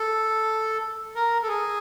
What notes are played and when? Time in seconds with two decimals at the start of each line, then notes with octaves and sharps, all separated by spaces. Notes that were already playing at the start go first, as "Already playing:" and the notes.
Already playing: A4
1.15 A#4
1.43 A4
1.48 G#4